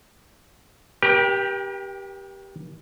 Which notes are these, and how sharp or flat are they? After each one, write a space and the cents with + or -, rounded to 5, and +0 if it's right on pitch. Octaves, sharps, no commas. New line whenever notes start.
G4 +0 A#4 +45 G5 +30